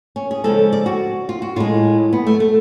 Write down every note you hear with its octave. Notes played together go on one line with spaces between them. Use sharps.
C#4
G#4
C#3 F3 G#3 A4
D5
F#4
F4
F#4
A2 G#3 F4
B3
A3
A3